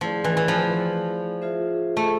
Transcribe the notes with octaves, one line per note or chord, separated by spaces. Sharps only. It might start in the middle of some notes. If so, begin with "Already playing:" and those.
F3 A3 E4 G#4 D5
E3
E3
F3
F4 G#4 C5 E5
A3